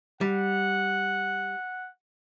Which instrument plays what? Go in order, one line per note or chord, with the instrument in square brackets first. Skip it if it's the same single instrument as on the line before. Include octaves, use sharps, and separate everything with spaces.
[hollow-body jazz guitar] G3 [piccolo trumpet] F#5